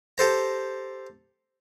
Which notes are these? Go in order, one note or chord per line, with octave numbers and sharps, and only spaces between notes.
G4 A4 C5 A#5